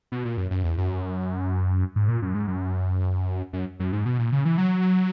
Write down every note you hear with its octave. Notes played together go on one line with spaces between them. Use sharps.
B2
A#2
F#2
F#2
E2
F#2
G#2
A#2
F#2
G#2
F#2
F#2
F#2
G#2
B2
A#2
C#3
E3
F#3